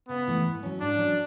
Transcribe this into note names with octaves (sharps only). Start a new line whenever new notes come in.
C#3 B3
E3 A3
G#2
F#3 C#4
G#2 D4
F#3 C#4